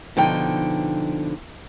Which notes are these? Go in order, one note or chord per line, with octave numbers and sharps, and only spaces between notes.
B2 D3 F3 D#4 G5